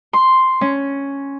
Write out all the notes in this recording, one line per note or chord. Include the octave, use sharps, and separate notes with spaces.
C6
C#4